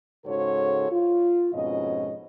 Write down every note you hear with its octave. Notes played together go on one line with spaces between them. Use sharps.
G#2 C#3 F#4 A4 C5 C#5
F4
F2 G#2 B2 C#4 D#5